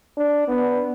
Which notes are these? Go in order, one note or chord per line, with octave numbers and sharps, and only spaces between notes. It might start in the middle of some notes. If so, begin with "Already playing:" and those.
D4
B3